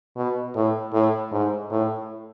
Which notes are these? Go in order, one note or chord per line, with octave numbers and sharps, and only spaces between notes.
B2
A2
A2
G#2
A2